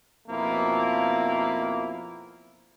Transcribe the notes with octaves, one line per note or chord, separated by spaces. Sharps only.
F2 B2 F3 A#3 E4